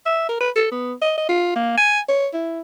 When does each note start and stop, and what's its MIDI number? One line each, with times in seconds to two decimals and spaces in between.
0.06 0.28 76
0.29 0.37 70
0.41 0.50 71
0.56 0.67 69
0.72 0.94 59
1.02 1.14 75
1.18 1.27 75
1.29 1.51 65
1.56 1.76 58
1.77 2.00 80
2.09 2.27 73
2.34 2.61 64